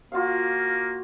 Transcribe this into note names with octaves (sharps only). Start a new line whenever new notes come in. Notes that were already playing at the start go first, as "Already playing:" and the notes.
A#3 F4 F#4 F5